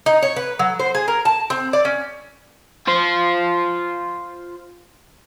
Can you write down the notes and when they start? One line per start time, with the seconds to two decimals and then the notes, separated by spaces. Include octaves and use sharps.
0.06 D#4
0.23 C#5
0.36 B4
0.59 F#3
0.80 C5
0.95 G#4
1.08 A#4
1.25 A5
1.50 C4
1.73 D5
1.85 C#4
2.88 F4 C5